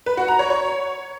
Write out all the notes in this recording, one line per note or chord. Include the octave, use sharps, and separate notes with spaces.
B4
F#4
A#5
C#5
C#5